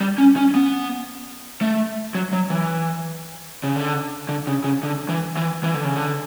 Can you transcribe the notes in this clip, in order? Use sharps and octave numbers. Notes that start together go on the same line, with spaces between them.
G3
C#4
C#4
B3
A3
F#3
F#3
E3
C#3
D3
D3
C#3
C#3
D3
E3
E3
E3
D3
C#3
D3